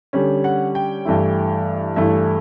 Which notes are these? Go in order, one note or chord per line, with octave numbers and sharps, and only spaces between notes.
D3 G3 C#4
F#5
G5
G2 E3 A3 E4
G2 E3 A3 E4 E5